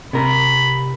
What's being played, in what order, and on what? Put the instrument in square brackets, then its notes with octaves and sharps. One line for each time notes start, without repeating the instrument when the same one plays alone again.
[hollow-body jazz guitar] C3 A#4 [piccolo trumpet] B5